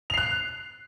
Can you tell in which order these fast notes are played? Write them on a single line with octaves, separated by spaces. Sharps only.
F7 C7 F#6